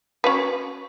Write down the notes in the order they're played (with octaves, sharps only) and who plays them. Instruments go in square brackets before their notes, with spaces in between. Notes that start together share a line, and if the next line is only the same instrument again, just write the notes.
[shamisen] C#4 F#4 B4